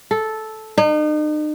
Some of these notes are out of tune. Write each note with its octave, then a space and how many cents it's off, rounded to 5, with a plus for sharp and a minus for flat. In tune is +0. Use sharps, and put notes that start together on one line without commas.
A4 -10
D#4 -40